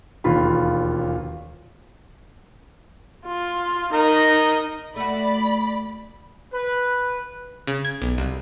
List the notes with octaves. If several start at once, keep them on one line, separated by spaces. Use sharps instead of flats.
E1 D#2 F4 B5
F4
D#4 A#4 D#5
A3 F#4 D5 B5
B4
C#3
G#6
B1
C2